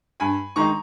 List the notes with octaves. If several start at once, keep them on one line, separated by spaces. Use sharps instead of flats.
G2 G#5 B5
D#3 G#3 D#4 A#5 C#6